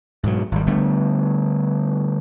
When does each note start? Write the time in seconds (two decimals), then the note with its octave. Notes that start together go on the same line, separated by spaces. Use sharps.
0.23 G#2 B2 D3 F#3
0.52 G#1 G3
0.66 D3 G3 A3 B3